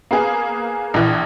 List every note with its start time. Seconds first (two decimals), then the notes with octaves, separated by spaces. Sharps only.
0.11 A#3 B3 G#4
0.94 A#1 E3